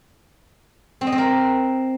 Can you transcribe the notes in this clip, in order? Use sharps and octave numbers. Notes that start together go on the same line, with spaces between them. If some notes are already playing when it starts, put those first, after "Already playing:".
C4
D#5
C4
A#4